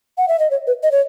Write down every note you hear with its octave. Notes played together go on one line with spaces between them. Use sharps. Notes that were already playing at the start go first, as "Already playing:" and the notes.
F#5
E5
D#5
C#5
B4
D#5
C#5